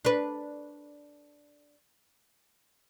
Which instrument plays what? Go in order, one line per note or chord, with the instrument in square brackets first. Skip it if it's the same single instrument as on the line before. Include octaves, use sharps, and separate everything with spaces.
[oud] D4 B4